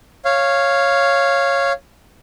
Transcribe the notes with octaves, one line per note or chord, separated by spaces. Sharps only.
C#5 F5